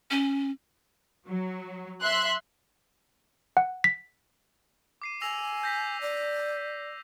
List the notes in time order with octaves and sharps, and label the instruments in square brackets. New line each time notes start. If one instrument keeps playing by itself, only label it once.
[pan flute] C#4
[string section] F#3
E5 C6 F#6
[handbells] F#5
B6
[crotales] D6 C7 D#7
[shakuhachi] G#5 [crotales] E6 A#6 F7
[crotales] G6 A#6 B6
[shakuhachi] D5
[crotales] B6